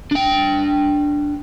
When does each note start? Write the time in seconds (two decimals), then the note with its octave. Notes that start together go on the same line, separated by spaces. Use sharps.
0.11 D4 G5